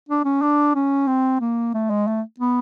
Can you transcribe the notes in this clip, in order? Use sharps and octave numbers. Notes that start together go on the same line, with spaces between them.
D4
C#4
D4
C#4
C4
A#3
A3
G#3
A3
B3